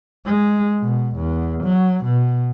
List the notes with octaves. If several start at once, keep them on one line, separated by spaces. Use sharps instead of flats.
G#3
B2
E2
F#3
B2